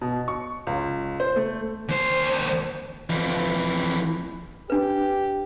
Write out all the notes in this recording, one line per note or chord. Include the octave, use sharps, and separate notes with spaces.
B2
C#6
C#2
C5
A3
D#2 C5
F2 E3
D4 G4 B4